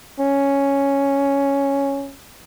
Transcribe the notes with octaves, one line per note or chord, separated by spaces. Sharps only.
C#4